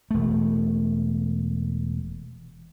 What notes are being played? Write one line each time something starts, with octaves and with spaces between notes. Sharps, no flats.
E1 A3